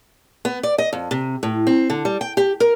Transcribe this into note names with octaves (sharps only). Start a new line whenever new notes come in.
B3
D5
D#5
F2
C3
A2
C4
D3
G3
G5
G4
A#4